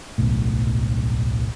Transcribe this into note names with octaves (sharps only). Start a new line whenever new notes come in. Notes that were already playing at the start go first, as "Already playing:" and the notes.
D1 B1 A2